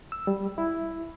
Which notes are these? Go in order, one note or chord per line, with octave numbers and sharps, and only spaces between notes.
E6
G3
E4